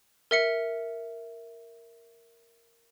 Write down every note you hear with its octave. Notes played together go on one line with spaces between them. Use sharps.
A#4 E5 C#7